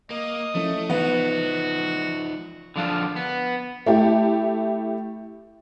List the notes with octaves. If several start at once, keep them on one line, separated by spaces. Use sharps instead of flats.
A#3 D#5
F3 A3 C#4 E4
E3 F3 B3 D#4 F#4
D3 F3 D4 F4
B3
A3 E4 G4